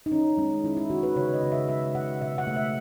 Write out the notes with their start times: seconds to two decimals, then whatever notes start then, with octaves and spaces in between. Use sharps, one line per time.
0.06 D#4
0.12 D#3 C#4
0.38 G#3 C#4
0.64 D#3 E4
0.77 E4
0.90 D#3 F#4
1.03 B4
1.16 C#3 C#5
1.34 D#5
1.43 C#3
1.52 E5
1.69 G#3 E5
1.95 C#3 F#5
2.21 B2 E5
2.38 F#5
2.47 A3
2.56 E5